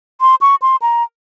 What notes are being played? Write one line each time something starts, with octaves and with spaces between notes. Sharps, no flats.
C6
C#6
C6
A#5